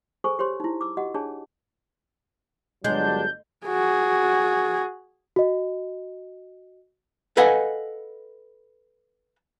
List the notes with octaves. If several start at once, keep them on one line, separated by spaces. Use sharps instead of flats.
G#4 A4 C5 G#5 C#6
G4 C5 C#5 C6
D#4 E4
D6 E6
F#4 G4 D#5 F#5
D4 G#4 C#5 A5
G1 F#3 G#3 D4 G6
F#4 G#4
F#4 D#5
A4 B4 D#5 F5 F#5 G#5